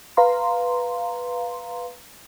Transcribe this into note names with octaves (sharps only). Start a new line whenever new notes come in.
B4 F5 A#5 C6